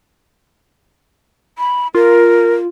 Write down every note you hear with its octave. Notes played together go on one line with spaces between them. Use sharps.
B5
F4 A#4